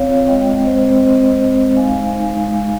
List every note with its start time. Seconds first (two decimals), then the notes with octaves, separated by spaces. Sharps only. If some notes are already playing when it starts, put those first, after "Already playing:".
Already playing: C4 C#5 F5
0.09 F4
0.27 G#3 D#5 G5
0.46 C4
0.65 G#3 C5 D#5
0.84 C4
1.02 G#3 C5 D#5
1.21 G#3
1.39 C4
1.59 G#3
1.76 D#4 F5 G#5
1.95 G#3
2.14 D#4
2.33 G#3
2.51 D#4